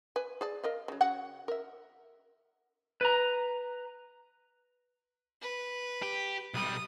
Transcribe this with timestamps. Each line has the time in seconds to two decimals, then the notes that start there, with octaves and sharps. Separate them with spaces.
0.16 B4 G#5
0.41 G#4 D5 A5
0.63 A#4 D#5 F5
0.88 C#3 F#3
1.01 C#3 F#4 F#5
1.48 A#4 E5
3.01 B4 A#5
5.42 B4
6.02 G4
6.54 B1 G3 D#6